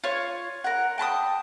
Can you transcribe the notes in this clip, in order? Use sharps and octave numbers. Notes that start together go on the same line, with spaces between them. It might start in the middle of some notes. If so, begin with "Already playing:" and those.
F4 C#5
A#4 F#5
G5 A5 B5 D#6